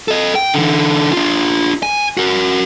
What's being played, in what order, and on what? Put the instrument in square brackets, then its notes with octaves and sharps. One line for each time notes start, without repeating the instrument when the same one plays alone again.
[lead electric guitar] A4 D#5
G5
D3 E3
D4 F4
G#5
F#4 A#4